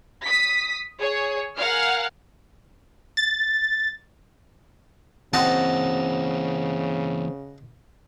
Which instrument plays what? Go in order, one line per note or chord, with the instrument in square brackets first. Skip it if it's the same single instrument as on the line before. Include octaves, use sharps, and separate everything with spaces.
[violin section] D#6 B6
G#4 C#5
A#4 F5 F#5 G#5 F6
[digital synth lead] A6
[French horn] C#3 [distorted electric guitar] E3 A#3 [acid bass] C4 [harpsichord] F#4 D#5 A5